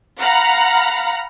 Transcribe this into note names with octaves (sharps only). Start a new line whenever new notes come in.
F5 F#5 A#5 B5 F6